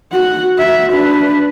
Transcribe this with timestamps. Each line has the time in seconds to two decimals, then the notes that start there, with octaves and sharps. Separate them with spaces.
0.12 F#4 F#5
0.58 F#4 E5
0.93 D4 B4